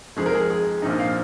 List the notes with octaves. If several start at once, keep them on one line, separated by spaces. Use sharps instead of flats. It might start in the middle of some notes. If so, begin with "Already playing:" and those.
F2 F3 G#3 D#4 G#4
A#4
G#4
G#4
A#1 A#2 F3 C4 D#4
F5